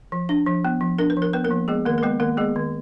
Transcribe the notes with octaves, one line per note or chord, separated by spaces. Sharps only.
F3
D4
F3
B3
F3
D4 A#4
B4
F3
A#4
B3 B4
A#3 A#4
F3
G#3 B3 G#4
D#3 A#3 A#4
A#4
G#3 B3 B4
D#3 A#3 A#4
G#3 B3 G#4
D#3